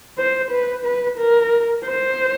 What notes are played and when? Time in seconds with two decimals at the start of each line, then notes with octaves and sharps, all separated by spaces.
0.18 C5
0.51 B4
0.84 B4
1.17 A#4
1.85 C5